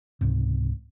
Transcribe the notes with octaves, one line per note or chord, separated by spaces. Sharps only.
C#2 G#2 C3